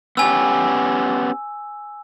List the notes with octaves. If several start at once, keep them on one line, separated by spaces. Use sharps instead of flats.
B3 C#4 G4 G#5 E6